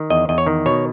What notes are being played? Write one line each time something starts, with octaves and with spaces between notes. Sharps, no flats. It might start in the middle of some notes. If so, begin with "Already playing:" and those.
Already playing: D#3
E2 D#5
E2 D#5
C#5
D#3
B2 C#5